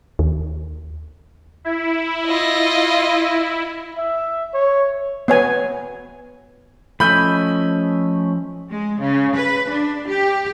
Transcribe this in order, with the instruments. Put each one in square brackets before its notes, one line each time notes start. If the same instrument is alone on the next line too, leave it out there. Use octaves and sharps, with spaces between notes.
[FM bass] D#2
[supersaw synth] E4
[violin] F4 D#5
[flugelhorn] E5
C#5
[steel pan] B3 C#5 G#5
[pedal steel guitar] F3 D#5 E5 [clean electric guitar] A3 C#4 [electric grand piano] B5 G6
[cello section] G#3
C#3
B4
D4
G4